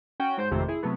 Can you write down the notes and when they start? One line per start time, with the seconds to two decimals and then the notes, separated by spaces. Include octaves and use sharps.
0.20 C#4 F#4 G5
0.37 G#2 C5 G6
0.51 G#1 F2 C3 D#3 A3 C5
0.68 E4 G#4
0.83 C3 F#3 A3 B3